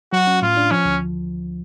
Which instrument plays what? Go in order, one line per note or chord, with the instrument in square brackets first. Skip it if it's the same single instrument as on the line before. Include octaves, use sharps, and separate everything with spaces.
[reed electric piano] F#3 [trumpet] F#4
[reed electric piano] C#4
[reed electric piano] A2 [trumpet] F4
[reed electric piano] D4
[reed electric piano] F3 [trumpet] C#4
[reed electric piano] D2